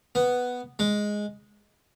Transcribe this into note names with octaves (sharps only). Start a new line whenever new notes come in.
B3
G#3